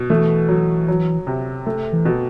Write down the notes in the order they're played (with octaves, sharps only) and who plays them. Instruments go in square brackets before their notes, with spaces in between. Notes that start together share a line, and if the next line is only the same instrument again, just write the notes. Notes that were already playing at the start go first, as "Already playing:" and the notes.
Already playing: [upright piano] B2
[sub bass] E3 [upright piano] A3
[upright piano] F#3
F#3
C3
A3
[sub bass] E3
[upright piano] B2